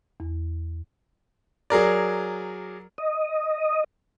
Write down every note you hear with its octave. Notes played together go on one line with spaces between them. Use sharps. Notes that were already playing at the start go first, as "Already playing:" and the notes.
E2
F#3 G#4 A#4 D5
D#5